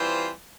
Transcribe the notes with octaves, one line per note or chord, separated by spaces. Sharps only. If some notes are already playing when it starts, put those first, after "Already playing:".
Already playing: E3 G3 C4 F4 C5